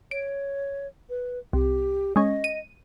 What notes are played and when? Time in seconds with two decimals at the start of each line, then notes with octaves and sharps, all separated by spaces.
0.11 C#5 D7
1.09 B4
1.53 C2 G4
2.16 G#3 C#4 D#5
2.44 D#7